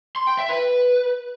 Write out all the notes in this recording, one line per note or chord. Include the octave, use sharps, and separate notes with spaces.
C6
G5
E5
B4